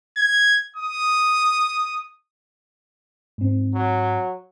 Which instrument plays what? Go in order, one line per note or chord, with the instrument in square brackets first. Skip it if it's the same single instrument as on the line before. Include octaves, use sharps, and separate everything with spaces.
[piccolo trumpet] G#6
D#6
[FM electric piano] G#2 C4
[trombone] F#3